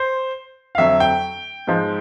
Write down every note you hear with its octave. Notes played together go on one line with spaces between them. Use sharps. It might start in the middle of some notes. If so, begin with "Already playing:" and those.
Already playing: C5
F5
F2 D3 F#3 E5
G5
G#2 F3 G#3